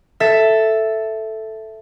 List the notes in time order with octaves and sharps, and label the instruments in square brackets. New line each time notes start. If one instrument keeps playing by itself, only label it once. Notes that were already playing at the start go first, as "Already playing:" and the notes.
[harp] A4 E5